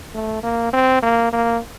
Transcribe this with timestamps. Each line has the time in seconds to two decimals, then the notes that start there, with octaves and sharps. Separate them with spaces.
0.14 A3
0.43 A#3
0.73 C4
1.02 A#3
1.33 A#3